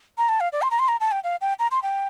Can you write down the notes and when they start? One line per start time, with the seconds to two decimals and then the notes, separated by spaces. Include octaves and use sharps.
0.18 A#5
0.29 A5
0.40 F5
0.52 D5
0.62 C6
0.71 A#5
0.79 C6
0.88 A#5
1.00 A5
1.11 G5
1.24 F5
1.41 G5
1.59 A#5
1.71 C6
1.83 G5